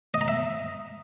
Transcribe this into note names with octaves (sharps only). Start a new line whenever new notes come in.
D#5
A#5
E5